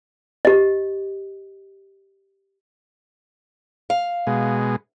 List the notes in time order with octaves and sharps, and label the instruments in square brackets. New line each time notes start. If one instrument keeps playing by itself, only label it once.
[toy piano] G4 D#5
[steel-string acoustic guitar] F5
[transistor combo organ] B2 G#3